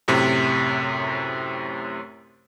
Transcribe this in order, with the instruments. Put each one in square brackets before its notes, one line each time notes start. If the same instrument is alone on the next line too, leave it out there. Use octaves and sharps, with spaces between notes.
[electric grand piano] F#2 A2 C3